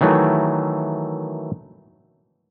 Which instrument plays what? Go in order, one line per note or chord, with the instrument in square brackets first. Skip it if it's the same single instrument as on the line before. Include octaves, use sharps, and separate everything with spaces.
[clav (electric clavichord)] D#3 E3 F#3 A3